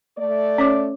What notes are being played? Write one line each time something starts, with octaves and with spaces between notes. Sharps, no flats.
A3 D5
C#4 C#5 D6